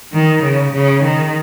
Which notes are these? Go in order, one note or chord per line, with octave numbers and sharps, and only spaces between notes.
D#3
C#3
C#3
D#3